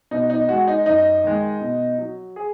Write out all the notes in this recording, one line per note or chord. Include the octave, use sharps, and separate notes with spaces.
B2 D#4
D#4
G#3 F#4
D#4
F#2 D#4
D#3 G#3
B2
F#3
G#4